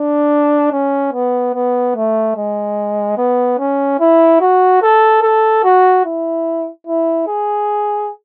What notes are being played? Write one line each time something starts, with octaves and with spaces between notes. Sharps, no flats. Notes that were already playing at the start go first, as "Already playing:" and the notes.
Already playing: D4
C#4
B3
B3
A3
G#3
B3
C#4
E4
F#4
A4
A4
F#4
E4
E4
G#4